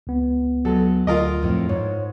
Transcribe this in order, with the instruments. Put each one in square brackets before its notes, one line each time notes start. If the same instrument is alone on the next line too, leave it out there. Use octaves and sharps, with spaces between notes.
[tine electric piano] C#2 B3
[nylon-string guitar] F#3 G#3 [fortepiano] A4
[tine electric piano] D2 [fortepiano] F4 A#4 D#5
[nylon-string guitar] F2 A2
[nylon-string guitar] G#2 [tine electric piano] C#5